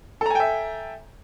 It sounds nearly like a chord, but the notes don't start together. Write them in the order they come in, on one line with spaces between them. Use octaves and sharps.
A4 A#5 G#5 G5 E5